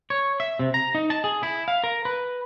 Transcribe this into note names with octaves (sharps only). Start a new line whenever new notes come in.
C#5
E5
C3
A#5
D#4
A5
G#4
E4
F5
A#4
B4